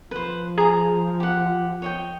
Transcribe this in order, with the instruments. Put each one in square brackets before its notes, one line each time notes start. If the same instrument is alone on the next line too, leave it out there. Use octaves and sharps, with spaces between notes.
[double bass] F3 [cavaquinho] B4 C5
[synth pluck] G#4 [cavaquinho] A#5 D#6
[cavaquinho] G4 F#5
C#5 D#5 G5